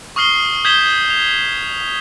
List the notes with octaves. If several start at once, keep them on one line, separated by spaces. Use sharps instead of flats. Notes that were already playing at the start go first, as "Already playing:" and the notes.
C#6 D#6 F6 C7 G7
D#6 G6 G#6 B6 E7 G7
F7